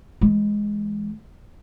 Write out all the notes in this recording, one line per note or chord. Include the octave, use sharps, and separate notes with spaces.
E3 G#3